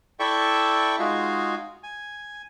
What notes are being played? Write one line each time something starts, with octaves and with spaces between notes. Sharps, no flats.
E4 A4 D5 E5 G5 C#6
G#3 D#4 F4 F#4 G#4 F5
G#5